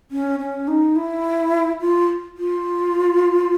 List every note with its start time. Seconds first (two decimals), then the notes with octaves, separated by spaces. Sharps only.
0.11 C#4
0.40 C#4
0.68 D#4
0.96 E4
1.81 F4
2.37 F4